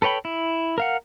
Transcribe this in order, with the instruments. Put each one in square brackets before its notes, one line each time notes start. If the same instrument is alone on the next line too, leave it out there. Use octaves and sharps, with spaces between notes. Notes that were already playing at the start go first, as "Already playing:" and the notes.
[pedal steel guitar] A4 B4 C#5 G5 B5
E4
A#4 F5 F#5